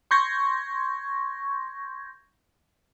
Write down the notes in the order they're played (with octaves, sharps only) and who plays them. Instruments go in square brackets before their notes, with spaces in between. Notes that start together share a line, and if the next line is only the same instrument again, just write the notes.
[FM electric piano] C6 C#6 G6 G#6 A#6